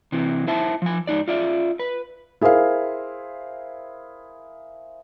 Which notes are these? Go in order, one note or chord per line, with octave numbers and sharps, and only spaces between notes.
C3 E3
E4 C5 E5 A5
F3 G#5
G#2 D#4 D5
F4 D5 E5
B4
E4 G#4 A#4 C5 F5